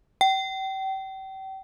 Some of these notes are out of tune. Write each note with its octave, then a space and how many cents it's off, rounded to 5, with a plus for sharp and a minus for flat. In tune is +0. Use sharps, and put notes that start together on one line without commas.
G5 -35